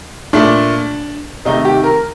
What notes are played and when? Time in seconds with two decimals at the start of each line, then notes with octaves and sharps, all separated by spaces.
0.33 A#2 A3 D4
1.45 C3 D#3 A3 D#4
1.65 G4
1.84 A#4